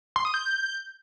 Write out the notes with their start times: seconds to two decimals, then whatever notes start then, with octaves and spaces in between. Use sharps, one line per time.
0.16 C6
0.25 D#6
0.34 G6